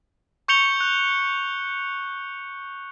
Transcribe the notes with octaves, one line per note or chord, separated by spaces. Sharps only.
C#6 G6 C#7 F7 G7
F#6